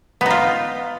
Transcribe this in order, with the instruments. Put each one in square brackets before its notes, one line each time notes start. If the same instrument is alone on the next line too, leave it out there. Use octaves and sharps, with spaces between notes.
[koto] B3
D#4
F4